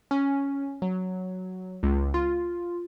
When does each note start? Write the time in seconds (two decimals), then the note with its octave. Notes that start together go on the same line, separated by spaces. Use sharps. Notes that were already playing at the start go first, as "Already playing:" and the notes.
0.11 C#4
0.82 F#3
1.83 C#2
2.14 F4